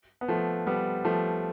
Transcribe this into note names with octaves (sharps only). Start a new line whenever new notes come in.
B3
F3 A3
G3 B3
F3 A3